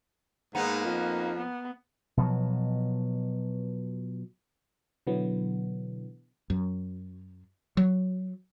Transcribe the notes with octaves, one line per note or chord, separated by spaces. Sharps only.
G#2 A#3 B3 D#4
F2
B3
B2 F3 F#3
B2 D3 E3 F#3 B3
F#2
F#3